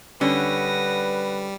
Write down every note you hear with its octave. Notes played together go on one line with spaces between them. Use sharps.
D3 G3 C#4 B4 F#5 D#6 A#6